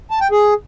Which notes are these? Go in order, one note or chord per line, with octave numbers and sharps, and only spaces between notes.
A5
G5
G#4